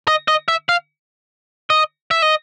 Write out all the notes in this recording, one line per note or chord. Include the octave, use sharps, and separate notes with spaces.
D#5
D#5
E5
F5
D#5
E5
D#5